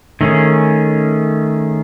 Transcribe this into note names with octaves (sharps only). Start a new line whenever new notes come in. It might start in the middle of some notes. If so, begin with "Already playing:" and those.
D#3 A3 C#4 G#4